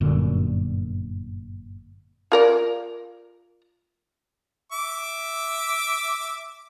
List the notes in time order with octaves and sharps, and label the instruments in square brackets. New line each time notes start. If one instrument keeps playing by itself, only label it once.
[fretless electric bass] G1 F#2 A#2 D3
[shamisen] F4 A#4 D5
[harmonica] E5 D6